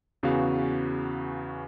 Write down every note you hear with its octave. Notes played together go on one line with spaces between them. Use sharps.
E2 C#3 B3 F#4 F5